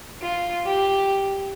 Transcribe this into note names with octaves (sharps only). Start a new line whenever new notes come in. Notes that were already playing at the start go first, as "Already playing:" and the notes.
F4
G4